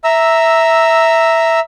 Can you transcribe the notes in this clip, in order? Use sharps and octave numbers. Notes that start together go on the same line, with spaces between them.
E5 A#5 E6